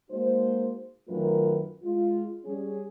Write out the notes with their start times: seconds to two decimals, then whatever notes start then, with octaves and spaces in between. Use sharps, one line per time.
0.10 G#3 A#3 D#4 F#4 C5
1.08 F#2 D#3 A3 F4 A#4 B4
1.83 G#3 F4
2.45 G3 C#4 G#4